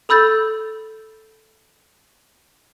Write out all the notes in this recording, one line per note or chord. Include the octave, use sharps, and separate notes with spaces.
A4 B5 E6 G6 A6